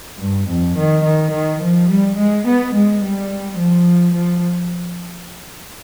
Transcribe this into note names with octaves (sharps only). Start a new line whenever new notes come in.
G2
F2
D#3
D#3
D#3
F3
G3
G#3
B3
G#3
G3
F3
F3